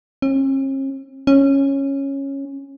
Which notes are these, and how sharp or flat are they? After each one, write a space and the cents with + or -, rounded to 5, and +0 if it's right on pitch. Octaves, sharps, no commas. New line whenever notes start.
C#4 -45
C#4 -10